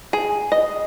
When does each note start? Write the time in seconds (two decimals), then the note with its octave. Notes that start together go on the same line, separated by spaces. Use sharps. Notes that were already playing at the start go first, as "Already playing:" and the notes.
0.13 G#4
0.52 D#5